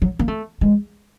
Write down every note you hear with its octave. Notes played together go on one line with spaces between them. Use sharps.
F#3
A#3
A3
G#3